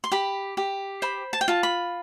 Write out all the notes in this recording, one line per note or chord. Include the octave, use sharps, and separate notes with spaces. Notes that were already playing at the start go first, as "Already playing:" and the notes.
C6
G4 B5
G4
C5 B5
A5
G5
F4 A5
B5